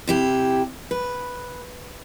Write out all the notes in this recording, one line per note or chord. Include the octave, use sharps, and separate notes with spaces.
C3 E4 G4
B4